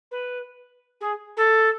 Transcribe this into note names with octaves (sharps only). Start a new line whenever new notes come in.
B4
G#4
A4